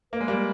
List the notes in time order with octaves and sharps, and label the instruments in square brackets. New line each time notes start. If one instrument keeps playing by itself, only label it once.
[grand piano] A#3 [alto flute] B4
[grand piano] G#3
G3 A#3